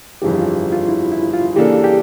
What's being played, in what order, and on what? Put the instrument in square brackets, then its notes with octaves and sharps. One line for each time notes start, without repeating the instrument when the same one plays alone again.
[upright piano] G1 F2 C#3 E3 [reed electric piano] G4
[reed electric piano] F4
F4
E4
E4
F4
[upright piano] C#3 E3 A#3 D4 A4 [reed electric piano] G4
[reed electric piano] G4